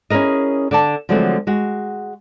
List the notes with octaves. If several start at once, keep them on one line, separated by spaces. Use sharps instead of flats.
C#4 E4 G#4 A#4 D#5
D3 D5 A5
D3 F3 F#3 G#3 A3 C4
G#3 F#4